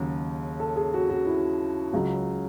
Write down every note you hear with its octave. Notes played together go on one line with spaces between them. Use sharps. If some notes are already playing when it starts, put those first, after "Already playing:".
Already playing: D#2 C#3 F#3
A4
G#4
F#4
F#4
E4
C#2 C#3 F#3